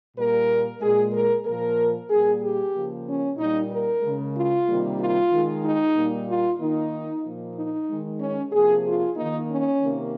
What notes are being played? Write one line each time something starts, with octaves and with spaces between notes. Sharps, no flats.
A#2 G3 A#3 A#4
A#2 G#3 G#4
A#4
A#2 F3 A#3 A#4
A#2 G3 A#3 G#4
G4
C#3 F3 A#3
C#4
A#2 G3 A#3 D#4
A#4
C#3 G#3
F4
C3 D#3 G3 A#3
F4
D#3 G#3
D#4
A#2 G3 A#3
F4
D#3 A#3 D#4
A#2 F3 A#3
D#4
D#3 G#3
C#4
C3 F3 A#3 G#4
F4
D#3 A#3 D#4
C#4
C3 D#3 A#3